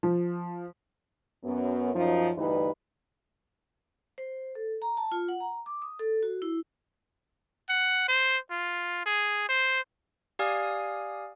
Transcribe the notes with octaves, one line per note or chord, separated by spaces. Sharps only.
F3
F#2 B3
F#2 F3 D#4
D2 G2 E3 D#4 E4 B4
C5
A4
A#5
A5
F4
F#5
A#5
D6
D#6
A4
F#4
E4
F#5
C5
F4
G#4
C5
G4 D5 F5 G#5 D#6 F6